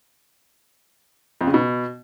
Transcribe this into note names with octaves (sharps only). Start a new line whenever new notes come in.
F2
C#3
B2